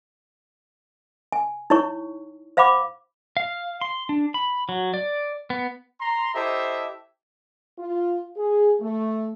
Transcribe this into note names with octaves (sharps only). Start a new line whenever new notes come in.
G#5
D#4 E4 C#5 C#6
C5 F5 F#5 B5 D6
F5
C6
D4
B5
F#3
D5
B3
A#5 C6
E4 G4 A4 C5 D#5 E5
F4
G#4
A3